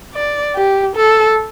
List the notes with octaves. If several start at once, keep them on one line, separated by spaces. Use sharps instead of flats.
D5
G4
A4